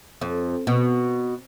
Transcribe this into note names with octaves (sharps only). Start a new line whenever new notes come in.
F2
B2